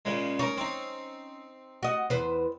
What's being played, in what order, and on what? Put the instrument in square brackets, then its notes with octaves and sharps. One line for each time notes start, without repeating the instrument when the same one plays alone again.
[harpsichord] A#2 C#3 G#3
[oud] C#4 [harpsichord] D#4 A#4
[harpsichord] C4 D#4
[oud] F#4 D#5
E2 B4 C5